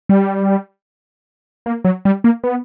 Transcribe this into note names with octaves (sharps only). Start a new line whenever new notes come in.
G3
A#3
F#3
G3
A#3
B3